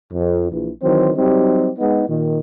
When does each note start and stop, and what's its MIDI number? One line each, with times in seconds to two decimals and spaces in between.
0.13 0.51 41
0.52 0.71 34
0.52 0.71 52
0.83 1.11 51
0.83 1.11 52
0.83 1.11 54
0.83 1.11 60
0.83 1.11 72
1.16 1.71 54
1.16 1.71 55
1.16 1.71 60
1.16 1.71 63
1.16 1.71 67
1.79 2.04 56
1.79 2.04 59
1.79 2.04 63
2.08 2.39 46
2.08 2.39 51